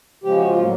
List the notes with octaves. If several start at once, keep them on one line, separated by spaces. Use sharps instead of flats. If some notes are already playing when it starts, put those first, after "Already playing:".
C#3 F3 G#3 G4
F#4
F4
A2 F#3 A#3